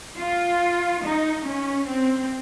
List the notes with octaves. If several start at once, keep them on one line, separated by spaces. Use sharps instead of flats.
F4
D#4
C#4
C4